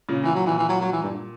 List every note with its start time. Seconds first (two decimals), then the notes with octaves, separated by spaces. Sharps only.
0.09 A#2 C#3
0.24 A#2 E3
0.35 F#3
0.46 A#2 E3
0.58 E3
0.69 F#3
0.81 F#3
0.92 E3
1.02 G2